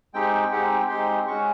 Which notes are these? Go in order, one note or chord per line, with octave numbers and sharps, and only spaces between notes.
G#3 C4 D#4 G4 G5
G#3 C4 D#4 G4 F#5
G5
G#3 C4 D#4 G4 C6
G#3 C#4 F#4 C#6